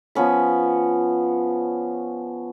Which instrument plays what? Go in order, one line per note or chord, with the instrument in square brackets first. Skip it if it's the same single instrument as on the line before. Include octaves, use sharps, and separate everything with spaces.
[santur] F3 B3 C#4 B5